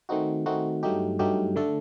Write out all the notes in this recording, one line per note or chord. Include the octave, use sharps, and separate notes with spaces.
D#3 A3 C4 D#4 F#4
D#3 A3 C4 D#4 F#4
G2 F#3 A3 D#4 G4
G2 F#3 A3 D#4 G4
D3 A3 D4 A4